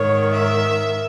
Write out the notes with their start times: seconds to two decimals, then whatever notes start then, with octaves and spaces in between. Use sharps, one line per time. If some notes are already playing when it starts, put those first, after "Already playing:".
Already playing: G#2 D#3 C#5
0.33 E5